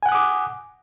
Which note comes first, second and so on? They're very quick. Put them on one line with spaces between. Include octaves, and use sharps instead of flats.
G#5 F#5 F#6 D#6 D6